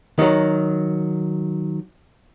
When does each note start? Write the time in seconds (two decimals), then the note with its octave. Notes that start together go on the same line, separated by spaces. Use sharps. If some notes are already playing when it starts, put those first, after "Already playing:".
0.19 D#3 F#3